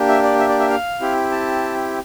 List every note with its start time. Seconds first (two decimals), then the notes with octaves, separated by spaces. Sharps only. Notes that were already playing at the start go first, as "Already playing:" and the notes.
Already playing: A#3 D4 G4
0.08 E5
0.23 D5
0.39 E5
0.49 D5
0.60 E5
0.70 F5
1.01 C4 E4 G4
1.31 A5